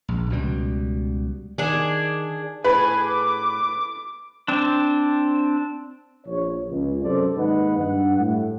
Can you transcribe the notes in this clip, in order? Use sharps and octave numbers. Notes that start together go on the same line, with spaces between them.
A#1
C#2 B2 G3
D#3 D4 G#4
A2 G#4 B4 G#5
D6
C4 D4
A#1 C#5
C#2
F#2 C3 C#4 A4 C5 D5
D#2 G#2 D#4 B4 D#5 F#5
G2 F#5
A2